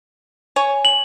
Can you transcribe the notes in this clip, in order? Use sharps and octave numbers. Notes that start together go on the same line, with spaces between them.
C#5 G#5
F#7